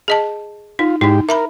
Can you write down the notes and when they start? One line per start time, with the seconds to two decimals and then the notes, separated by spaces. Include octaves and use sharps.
0.08 G#4 D#5 A5
0.79 D#4 F4
1.01 G#2 D#4 E4 G4
1.29 A#4 E5 A#5 B5